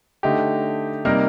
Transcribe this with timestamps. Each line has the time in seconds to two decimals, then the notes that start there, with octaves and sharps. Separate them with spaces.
0.23 D3 A3 D#4 G4
1.05 C3 G3 A#3 D#4 A#4